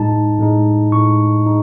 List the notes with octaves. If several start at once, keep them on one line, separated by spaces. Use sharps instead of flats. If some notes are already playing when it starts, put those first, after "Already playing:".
Already playing: A2 G#3 D#4 A5
A2 G#3 D#4
A2 G#3 D#4 C#6
G#3 D#4